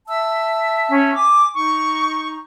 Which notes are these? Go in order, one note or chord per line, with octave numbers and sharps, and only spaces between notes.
E5 A5 E6
C#4
G#5 D6
D#4 C#6